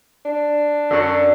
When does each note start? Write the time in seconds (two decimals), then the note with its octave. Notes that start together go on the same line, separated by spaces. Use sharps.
0.23 D4
0.90 F#2 D3 F#3